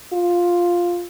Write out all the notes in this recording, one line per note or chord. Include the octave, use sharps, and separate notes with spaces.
F4